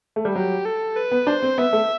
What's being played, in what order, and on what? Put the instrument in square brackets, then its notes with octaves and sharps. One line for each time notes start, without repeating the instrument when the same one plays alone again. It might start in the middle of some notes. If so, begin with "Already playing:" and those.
[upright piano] A3
G3
[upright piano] F#3 [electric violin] G4
[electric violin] A4
B4
[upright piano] B3
[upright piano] D4 [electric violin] C5
[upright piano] C4
[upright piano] B3 [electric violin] E5
[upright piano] A3